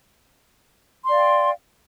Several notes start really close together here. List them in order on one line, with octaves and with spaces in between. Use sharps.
C6 D5 F5 G5